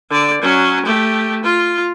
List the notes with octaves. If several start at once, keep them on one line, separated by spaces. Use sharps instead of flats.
D3 D5
F#3 C#4
A3 G4
F4